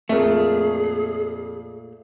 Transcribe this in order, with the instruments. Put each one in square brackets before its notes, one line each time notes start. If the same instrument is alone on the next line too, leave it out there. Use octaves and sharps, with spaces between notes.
[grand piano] F2 A#4 [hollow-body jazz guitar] A#2 A3 [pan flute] G#4